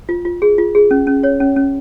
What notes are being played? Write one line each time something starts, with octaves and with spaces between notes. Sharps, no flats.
F4
F4
G#4
F4
G#4
C#4
C#4
C#5
C#4
C#4